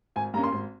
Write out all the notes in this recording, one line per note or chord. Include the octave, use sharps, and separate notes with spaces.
G#1 G#5
G2 G3 A#3 C#4 A#5
C6
G#1